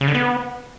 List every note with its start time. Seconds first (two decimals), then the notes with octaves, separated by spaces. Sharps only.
0.01 C#3
0.08 D3
0.15 B3